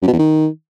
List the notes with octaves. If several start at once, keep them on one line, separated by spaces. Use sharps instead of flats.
F#2
B2
E2
D#3